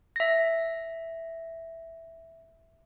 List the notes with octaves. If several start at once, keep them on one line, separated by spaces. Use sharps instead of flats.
E5 A#6